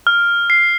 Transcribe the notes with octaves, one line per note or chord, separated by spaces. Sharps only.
F6
C7